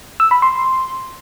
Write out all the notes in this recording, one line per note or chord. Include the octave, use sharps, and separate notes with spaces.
E6
B5
C6